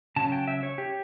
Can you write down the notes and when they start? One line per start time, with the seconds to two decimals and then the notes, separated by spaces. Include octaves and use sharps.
0.16 C#3 F#3 C#4 A5
0.32 G5
0.47 E5
0.63 C#5
0.78 G4